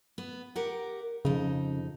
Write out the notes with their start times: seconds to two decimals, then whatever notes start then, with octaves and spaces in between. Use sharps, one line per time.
0.18 B3
0.56 G4 A#4 F#5
1.25 F2 C#3 D#4